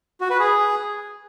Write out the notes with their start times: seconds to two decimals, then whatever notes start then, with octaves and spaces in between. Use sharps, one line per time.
0.21 F#4
0.30 B4
0.40 G#4